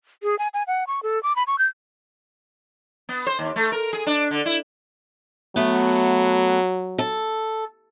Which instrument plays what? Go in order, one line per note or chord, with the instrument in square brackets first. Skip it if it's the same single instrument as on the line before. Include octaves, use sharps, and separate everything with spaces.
[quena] G#4
G#5
G#5
F#5
C#6
A4
D6
B5
C#6
G6
[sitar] B3
C5
D#2
A3
A#4
G#4
D4
D3
E4
[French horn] F#3 [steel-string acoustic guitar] A3 B3
[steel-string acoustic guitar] A4